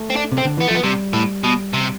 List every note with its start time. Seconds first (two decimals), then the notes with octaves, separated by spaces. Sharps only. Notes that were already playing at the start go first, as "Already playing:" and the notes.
Already playing: A3
0.10 C4
0.16 D4
0.32 C3
0.38 C4
0.45 D3
0.57 E3 B3
0.68 A3
0.70 F3 B3
0.83 C3 G3
1.13 A2
1.43 B2
1.73 C3